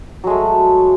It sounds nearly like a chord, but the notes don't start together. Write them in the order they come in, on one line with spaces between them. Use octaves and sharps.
F#3 G#3 A3